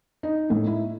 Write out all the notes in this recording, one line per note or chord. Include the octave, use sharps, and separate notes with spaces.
D#4
A2
E4